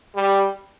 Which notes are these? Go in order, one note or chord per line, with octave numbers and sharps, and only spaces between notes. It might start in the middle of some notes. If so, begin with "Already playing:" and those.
G3